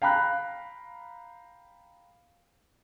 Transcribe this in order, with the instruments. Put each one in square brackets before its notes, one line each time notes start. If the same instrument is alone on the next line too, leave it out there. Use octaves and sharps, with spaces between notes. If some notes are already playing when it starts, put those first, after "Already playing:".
[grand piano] F5 G5 A#5 B5 F#6